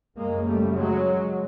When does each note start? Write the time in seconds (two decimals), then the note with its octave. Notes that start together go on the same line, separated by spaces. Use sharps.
0.17 F#2 C#3 G#3 A#3
0.46 G3 A3
0.76 F#3 G#3